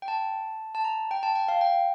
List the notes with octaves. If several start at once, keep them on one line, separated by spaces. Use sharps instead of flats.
G5
A5
A5
A#5
G5
A5
G5
F5
G5